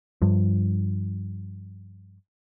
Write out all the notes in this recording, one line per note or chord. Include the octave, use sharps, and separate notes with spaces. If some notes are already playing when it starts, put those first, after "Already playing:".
G2 F3